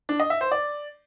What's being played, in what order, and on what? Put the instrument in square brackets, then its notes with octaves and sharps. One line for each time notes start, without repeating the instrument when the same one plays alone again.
[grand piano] D4
D#5
E5
C5
D5